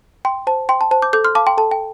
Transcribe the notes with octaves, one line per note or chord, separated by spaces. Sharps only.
G5 C6
C5 A5
G5 C6
A5
C5 A5
D6 G6
A4 D6 G6
C6 F6
F5 A5 D6
G5 C6
A4 A5
G5